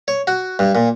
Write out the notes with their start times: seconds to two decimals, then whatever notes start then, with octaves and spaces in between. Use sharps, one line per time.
0.08 C#5
0.27 F#4
0.59 G2
0.75 A#2